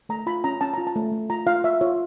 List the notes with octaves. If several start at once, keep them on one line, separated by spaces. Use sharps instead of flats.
A3 A#5
F4 B5
C#4 A#5
C#4 A5
F4 A#5
A5
A3
A3
F4 A#5
F4 F5
F4 E5
F4 C#5